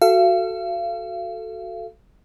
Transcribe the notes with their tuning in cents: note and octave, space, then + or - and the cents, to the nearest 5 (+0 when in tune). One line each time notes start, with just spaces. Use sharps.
F#4 +0 A4 +0 F5 -35